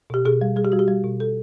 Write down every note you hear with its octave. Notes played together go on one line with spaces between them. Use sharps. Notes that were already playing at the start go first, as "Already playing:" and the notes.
B2 G4
B2 G#4
G3
G3 G#4
G4
G3 F#4
G4
G3
B2
A4